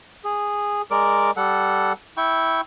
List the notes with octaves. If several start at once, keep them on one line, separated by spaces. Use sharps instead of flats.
G#4
G#3 A#4 D5 D6
G3 A4 F#5
E4 G5 C#6